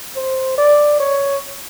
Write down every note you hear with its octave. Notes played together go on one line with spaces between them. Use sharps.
C5
D5
C#5